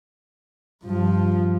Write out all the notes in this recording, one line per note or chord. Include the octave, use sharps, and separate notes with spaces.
G2 F3